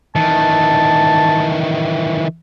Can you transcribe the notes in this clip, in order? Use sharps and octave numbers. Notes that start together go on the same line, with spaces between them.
D#3 E3 A5